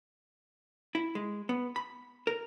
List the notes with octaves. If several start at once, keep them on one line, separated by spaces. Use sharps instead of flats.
E4
G#3
B3
B5
A#4